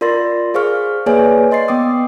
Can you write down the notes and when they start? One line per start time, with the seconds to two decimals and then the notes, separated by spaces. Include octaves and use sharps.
0.01 F4 A#4 D5 C6 A6 A#6
0.54 G#4 C5 F5 C#6 F6
1.06 A#3 G#4 B4 C#5 D5 G#5
1.51 D#5 C6 A6 C7
1.68 B3 G5 D6 D#6